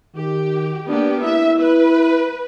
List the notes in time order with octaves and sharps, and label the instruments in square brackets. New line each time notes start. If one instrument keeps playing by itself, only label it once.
[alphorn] D#3 [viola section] G4
[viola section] A#3 B3 G4 [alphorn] D4
[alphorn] E4 [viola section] E5
[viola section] B4